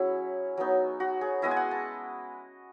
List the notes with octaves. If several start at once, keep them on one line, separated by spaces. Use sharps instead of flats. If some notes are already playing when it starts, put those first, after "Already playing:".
Already playing: F#3 C#4 E4 G#4 C#5
F#3 B3 D#4
F#4
G#4
G#3 B3 E4 D#5
G#5
F#5
A5